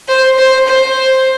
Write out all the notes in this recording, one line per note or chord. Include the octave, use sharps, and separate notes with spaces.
C5
C5
C5